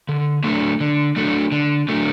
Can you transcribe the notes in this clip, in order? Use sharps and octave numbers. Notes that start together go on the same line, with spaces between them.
D3
F#3 A3 D4 A4
D3
F#3 A3 D4 A4
D3
F#3 A3 D4 A4